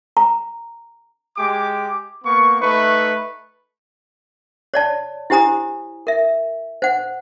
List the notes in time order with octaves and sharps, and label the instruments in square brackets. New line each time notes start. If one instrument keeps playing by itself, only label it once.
[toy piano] A#5
[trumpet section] G#3 G4 D6
A#3 B3 C#6
A3 D#4 B4 E5 C#6
[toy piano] C#5 D5 A5
E4 G4 C5 G#5 A#5 D#6
A#4 E5
C5 F#5